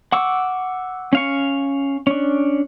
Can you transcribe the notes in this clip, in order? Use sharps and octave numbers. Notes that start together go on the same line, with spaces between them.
F#5 C#6 D6 E6
C#4 F5 C#6
C#4 D4